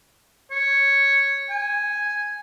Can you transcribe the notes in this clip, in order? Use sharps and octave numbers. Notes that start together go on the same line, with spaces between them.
C#5
G#5